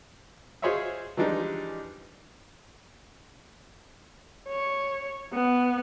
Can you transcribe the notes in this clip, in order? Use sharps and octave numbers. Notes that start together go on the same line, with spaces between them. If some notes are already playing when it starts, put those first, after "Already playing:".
F4 G#4 C5 C#5 D#5 E5
E3 F3 G3 G#3 D4 D#4
C#5
B3